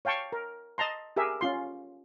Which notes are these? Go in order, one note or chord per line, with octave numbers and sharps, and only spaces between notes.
C#5 F5 G5 A5 C#6
A#4
D#5 A5 A#5 C6
G4 G#4 A#4 E5
C#4 F4 C6